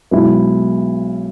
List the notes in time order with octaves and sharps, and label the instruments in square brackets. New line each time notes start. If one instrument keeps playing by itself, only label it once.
[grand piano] B1 B2 G#3 E4